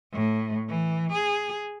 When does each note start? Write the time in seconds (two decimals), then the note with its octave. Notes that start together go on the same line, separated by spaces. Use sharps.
0.13 A2
0.69 E3
1.13 G#4